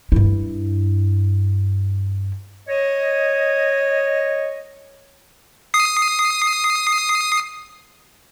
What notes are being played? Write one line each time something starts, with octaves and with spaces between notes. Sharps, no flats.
G2 E4
C#5 D#5
D#6 C7